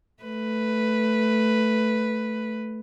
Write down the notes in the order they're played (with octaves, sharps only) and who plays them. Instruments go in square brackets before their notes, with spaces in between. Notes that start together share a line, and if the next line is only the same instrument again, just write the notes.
[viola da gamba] A3 B4